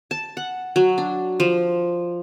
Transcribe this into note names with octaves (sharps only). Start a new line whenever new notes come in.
A5
F#5
F#3
D4
F3